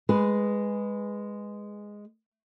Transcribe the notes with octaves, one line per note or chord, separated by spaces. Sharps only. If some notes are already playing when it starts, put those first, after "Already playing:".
G#3 G#4 B4